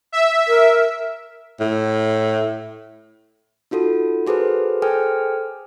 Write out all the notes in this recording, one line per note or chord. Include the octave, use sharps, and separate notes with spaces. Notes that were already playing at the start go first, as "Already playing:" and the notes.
E5
A#4
A2
D#4 F4 F#4 A4
F#4 G#4 A4 B4 C5
G#4 A4 C5 G5 G#5 F6